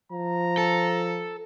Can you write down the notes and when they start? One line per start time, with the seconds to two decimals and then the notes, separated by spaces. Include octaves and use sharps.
0.12 F3 A#5
0.58 A4